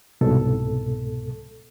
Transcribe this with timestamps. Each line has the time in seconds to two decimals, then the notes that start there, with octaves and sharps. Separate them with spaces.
0.21 C2 G#2 B2 A4